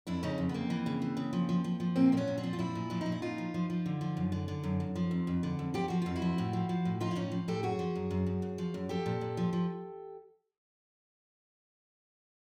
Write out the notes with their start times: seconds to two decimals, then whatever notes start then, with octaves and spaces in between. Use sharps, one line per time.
0.07 F2 D4 E4
0.23 C#3 C#4 D#4
0.38 F2
0.49 B3
0.54 F2 A#3 C4
0.70 E3
0.86 C#3
1.02 E3
1.17 C#3
1.33 F3
1.49 F3
1.64 F3
1.80 F3
1.96 A#2 A#3 C4
2.12 A#2 C4
2.17 B3 C#4
2.28 A#2
2.38 C4 D4
2.43 F3
2.53 F4
2.59 A#2 D4 E4
2.75 A#2
2.90 F3 D4
3.01 D#4
3.06 A#2
3.12 E4
3.22 A#2 D#4 F4
3.38 F3
3.54 F3
3.70 F3
3.86 D3
4.01 F3
4.17 F#2
4.32 D3
4.48 D3
4.64 F#2
4.80 F#2
4.95 F3
5.11 F2
5.27 F2
5.43 D3
5.59 F2
5.74 F3 G4
5.88 F3 F#4
6.02 F2 F4
6.16 E4 F#4
6.22 F3
6.38 A2
6.53 F3
6.69 F3
6.85 A2
7.00 F3 D#4 F4
7.11 E4
7.16 A2 C#4 D#4
7.32 F3
7.48 A2 G4 A4
7.63 F#2 F#4 G#4
7.79 F3
7.95 F#2
8.11 F#2
8.26 F#2
8.42 F#2
8.58 F3
8.74 F#2
8.89 F3 G4 A4
9.06 A#2
9.21 A#2
9.37 F3
9.53 F3